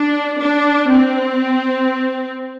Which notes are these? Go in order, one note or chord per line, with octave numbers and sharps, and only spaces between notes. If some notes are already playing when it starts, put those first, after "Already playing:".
Already playing: D4
D4
C4